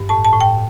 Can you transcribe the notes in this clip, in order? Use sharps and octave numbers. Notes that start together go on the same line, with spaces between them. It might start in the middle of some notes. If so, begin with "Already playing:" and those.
Already playing: G2
A2 A5
A5
A2
G5